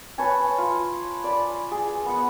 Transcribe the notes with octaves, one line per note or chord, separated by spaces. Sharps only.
B4 C#5 G#5 A5
F4
D5 B5
G#4
B3 F#5